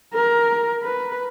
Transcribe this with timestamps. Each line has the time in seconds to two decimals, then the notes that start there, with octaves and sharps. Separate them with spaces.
0.14 A#4
0.83 B4